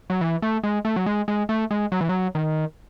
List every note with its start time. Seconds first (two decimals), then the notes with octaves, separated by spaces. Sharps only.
0.10 F#3
0.21 E3
0.42 A3
0.63 G#3
0.85 A3
0.96 F#3
1.06 G#3
1.28 G#3
1.49 A3
1.71 G#3
1.92 F#3
2.01 E3
2.09 F#3
2.35 D#3